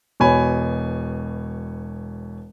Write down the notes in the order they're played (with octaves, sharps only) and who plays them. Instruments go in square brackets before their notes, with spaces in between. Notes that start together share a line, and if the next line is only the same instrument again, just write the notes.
[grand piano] E1 B2 C#5 G#5 B5